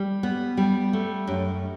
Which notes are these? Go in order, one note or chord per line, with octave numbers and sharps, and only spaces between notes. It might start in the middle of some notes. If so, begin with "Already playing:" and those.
Already playing: G3
B3
G3
A3
F#2